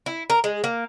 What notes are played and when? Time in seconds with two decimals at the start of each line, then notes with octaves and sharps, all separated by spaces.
0.06 E4
0.30 A#4
0.44 G#3
0.64 A#3